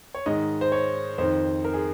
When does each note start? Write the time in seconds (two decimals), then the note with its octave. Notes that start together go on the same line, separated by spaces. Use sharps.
0.14 C#5
0.26 G#2 D#3 D#5
0.61 C5
0.72 C#5
1.18 F2 D#3 C5
1.65 A#4
1.73 G#4